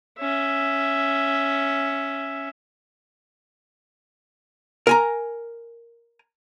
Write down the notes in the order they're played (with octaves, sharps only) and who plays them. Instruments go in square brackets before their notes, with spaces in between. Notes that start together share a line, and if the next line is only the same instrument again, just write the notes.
[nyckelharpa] C#4 E5
[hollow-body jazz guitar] A#4 G#5 A#5